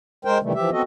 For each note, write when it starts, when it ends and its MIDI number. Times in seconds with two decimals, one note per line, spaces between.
0.25 0.38 56
0.25 0.38 70
0.25 0.38 72
0.25 0.38 79
0.43 0.53 48
0.43 0.53 51
0.43 0.53 52
0.43 0.53 55
0.43 0.53 57
0.54 0.70 52
0.54 0.70 53
0.54 0.70 67
0.54 0.70 76
0.71 0.82 59
0.71 0.82 60
0.71 0.82 66
0.71 0.82 69
0.71 0.82 75